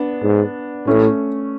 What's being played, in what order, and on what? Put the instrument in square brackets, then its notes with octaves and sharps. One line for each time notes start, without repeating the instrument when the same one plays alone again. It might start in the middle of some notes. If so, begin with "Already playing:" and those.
Already playing: [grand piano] B3 D4
[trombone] G#2
[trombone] A2 [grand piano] A3 C#4